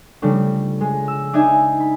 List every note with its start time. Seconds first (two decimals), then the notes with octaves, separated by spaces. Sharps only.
0.22 C#3 F3 G3 A3 D4
0.81 G#3
1.08 E6
1.33 D4 D#4 E5 G#5
1.80 B5